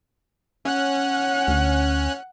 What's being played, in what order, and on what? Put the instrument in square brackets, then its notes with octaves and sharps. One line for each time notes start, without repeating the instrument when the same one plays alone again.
[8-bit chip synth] C#4 F#6 [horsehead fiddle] F#5
[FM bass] D2